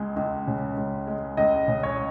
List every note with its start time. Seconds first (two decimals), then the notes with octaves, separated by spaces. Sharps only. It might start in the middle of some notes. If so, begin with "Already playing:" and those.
Already playing: C#2 G#3
0.16 C#2
0.47 C#3
0.77 C#2
1.07 G#3
1.37 C#2 D#5
1.68 C#3
1.83 C#5